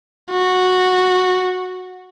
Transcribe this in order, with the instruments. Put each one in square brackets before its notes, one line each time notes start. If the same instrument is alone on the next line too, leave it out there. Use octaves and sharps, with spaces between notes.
[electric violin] F#4